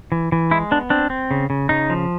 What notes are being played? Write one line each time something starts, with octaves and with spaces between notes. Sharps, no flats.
E3
E3
G#3 E4
B3 D4
C4 D4
C4
C#3
C#3
C#3 D#4
F3